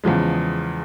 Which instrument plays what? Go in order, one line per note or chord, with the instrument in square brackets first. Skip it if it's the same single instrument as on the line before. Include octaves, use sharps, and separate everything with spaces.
[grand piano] E2 C#3 F3 G#3